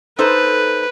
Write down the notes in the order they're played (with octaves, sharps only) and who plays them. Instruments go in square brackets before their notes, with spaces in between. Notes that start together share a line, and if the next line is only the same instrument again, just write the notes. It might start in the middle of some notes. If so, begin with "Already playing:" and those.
[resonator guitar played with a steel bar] D#4 A4 C5 [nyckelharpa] B4